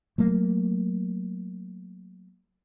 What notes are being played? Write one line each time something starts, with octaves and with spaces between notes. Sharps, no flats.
F#3 A3 A#3